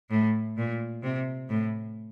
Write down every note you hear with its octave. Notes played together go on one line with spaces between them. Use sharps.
A2
A#2
C3
A2